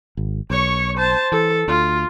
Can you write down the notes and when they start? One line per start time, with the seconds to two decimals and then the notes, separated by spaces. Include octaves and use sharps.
0.17 G#1
0.50 B1 C#5 C#6
0.97 C5 A5
1.32 E3 A4
1.68 D2 F4